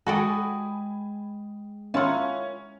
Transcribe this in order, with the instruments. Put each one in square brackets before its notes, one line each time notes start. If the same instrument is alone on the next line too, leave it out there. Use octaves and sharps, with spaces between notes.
[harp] G#3 G5 D#6 [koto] F#4 A4 D5 [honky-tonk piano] G#5 B5
[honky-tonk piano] C#4 [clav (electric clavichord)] E4 F4 A#4 [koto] F#5 A5